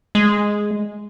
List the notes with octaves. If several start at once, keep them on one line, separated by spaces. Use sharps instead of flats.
G#3